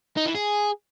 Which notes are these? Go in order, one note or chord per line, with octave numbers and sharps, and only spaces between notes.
D#4
E3
G#4